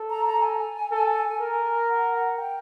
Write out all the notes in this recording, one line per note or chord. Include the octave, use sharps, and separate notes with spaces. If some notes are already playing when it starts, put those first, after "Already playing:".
Already playing: A4
A#5
A#5
G#5
A4
A#4
F#5
F#5
G5